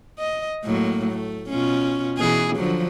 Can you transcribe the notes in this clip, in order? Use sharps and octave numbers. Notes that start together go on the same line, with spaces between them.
D#5
A2 F#3 A#3
A3
B2 C#4 F4
B2 E3 G#4
D3 F3 F#3